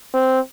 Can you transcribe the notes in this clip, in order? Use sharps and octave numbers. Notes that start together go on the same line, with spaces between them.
C4